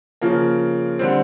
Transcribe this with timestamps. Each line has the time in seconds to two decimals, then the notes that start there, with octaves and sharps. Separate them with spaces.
0.21 C#3 F3 A#3
0.99 D3 G3 C4